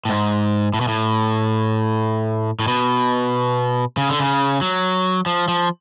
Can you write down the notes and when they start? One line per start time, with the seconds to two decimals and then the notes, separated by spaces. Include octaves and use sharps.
0.05 A2
0.09 G#2
0.74 A2
0.81 B2
0.88 A2
2.59 A2
2.68 B2
3.97 C#3
4.09 D3
4.20 C#3
4.61 F#3
5.26 F3
5.48 F3